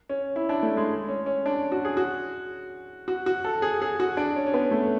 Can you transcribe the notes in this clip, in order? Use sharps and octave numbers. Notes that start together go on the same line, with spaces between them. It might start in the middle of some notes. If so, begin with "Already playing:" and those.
C#4
E4
D4
A3
G#3
C#4
C#4
D4
F#4
G#4
F#4
F#4
F#4
A4
G#4
G#4
F#4
D4
C#4
C#4
B3
A3